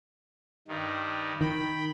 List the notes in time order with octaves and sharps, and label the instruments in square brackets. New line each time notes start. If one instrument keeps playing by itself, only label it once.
[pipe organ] G2 D#3
[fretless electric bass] D#3 [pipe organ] G5 B5